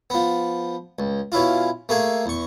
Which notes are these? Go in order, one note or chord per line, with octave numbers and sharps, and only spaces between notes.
F3 B3
C#2
B2 C#4 E4 F4
A3 A#3 G#4
E2 C#6